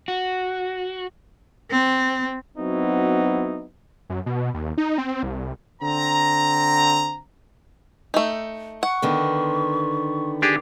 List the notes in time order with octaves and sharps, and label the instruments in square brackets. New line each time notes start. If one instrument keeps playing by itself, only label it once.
[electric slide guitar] F#4
[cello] C4
[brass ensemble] F#3 B3 C4 D#4 E4 F#4
[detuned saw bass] F#2
B2
D#2
D#4
C4
C2
[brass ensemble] D3 C4 A#5
[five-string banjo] A3 D#4
[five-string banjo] F#5 [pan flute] C#6
[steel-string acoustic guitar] D3 D#3 B3
[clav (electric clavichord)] D4 G4 G#4 [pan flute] D6